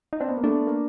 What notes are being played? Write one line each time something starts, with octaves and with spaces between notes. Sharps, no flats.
D#4
C4 D4
B3
A#3
A3 B3 D4
A#3